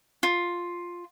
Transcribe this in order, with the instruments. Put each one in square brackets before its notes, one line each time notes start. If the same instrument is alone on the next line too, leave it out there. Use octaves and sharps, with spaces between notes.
[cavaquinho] F4